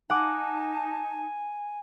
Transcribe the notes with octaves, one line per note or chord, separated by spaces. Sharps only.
D#4 F#5 G#5 A5 D6